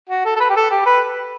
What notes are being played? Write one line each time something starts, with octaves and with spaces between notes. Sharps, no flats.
F#4
A4
A4
B4
G4
A4
G4
B4